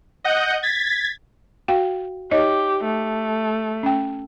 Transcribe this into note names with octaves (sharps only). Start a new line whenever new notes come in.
D#5 F#5 G6
G#6 A6 B6
F#4 F5 G5
D#4 G4 C#5 D#5
A3
C#4 G5